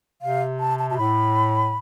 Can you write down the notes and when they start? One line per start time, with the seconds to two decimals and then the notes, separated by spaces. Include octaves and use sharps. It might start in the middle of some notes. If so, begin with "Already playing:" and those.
0.22 C3 F5
0.60 A5
0.79 A5
0.90 B2 A5
0.97 A2 B5